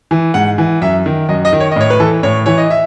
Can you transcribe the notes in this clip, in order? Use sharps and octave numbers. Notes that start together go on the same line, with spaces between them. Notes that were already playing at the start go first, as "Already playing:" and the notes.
E3
G#2 F#5
E3
F#2 E5
D#3
F#2 D#5
D#5
D#3
C#5
D#5
A2 C#5
B4
E3 A4
A2 C#5
E3 C#5
D#5
E5